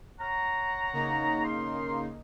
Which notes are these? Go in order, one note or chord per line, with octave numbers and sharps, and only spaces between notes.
C#5 F#5 A#5
C#3 A#3 D#4
A#4 C6